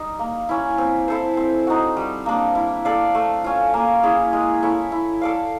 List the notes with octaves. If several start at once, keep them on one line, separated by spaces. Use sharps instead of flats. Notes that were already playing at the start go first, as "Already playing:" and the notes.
Already playing: G3 D#4
A#3
C#4 E4
C4
E4 A4 C5
C4
D#4 F#4
G3
A#3 D4
E4
A4 D5 F5
A3
C#4 F4
A#3
C#4 E4 G#4
G#3
C#4 E4 A4
E4
A4 D5 F5